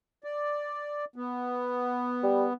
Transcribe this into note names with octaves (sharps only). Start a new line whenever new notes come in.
D5
B3
G3